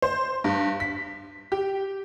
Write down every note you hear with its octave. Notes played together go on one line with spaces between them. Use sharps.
C5
G2
B6
G4